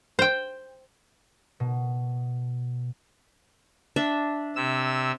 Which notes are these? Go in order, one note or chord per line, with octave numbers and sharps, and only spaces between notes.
C5 G5
B2
D4 E5
C3 E6